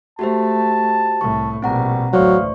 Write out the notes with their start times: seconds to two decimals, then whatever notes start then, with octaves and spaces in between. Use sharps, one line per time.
0.19 A3 F#4 G4 C5 A5
1.21 C2 A2 C#6
1.62 A#1 B2 G3 C4 F#5 A#5
2.13 A1 D2 F#3 C5 D5 F5 C#6